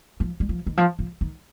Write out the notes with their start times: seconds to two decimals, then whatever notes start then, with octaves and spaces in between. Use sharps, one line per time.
0.20 F3
0.40 G3
0.49 F3
0.67 D#3
0.77 F3
0.99 F3
1.21 D#3